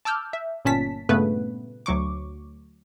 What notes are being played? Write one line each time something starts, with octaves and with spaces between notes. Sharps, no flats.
A5 D6 E6 F6 G6
E5
G1 A#2 C#4 A5 B6
G2 A#2 C#3 A3 B3 B4
D2 F#3 C#6 D6